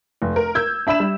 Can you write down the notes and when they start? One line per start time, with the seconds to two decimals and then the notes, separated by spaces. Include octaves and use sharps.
0.22 F1
0.36 A#4
0.55 E6 G6 G#6
0.87 D4 E5 B5 E6 E7
1.00 G3